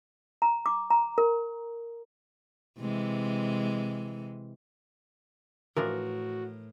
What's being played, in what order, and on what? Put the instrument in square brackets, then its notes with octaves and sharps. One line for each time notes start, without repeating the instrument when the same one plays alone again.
[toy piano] A#5
D6
A#5
A#4
[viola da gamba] C3 E3 G#3
[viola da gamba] A2 [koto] E3 F3 D4 [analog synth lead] F#4 [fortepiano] A#4